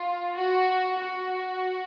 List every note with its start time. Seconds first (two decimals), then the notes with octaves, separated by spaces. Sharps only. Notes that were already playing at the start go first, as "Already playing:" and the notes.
Already playing: F4
0.34 F#4
0.97 F#4